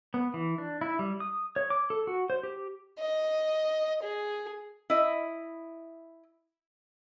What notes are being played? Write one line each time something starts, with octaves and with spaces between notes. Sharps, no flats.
B3
E3
D4
E4
G3
D#6
C#5
D6
A4
F#4
C5
G4
D#5
G#4
E4 D#5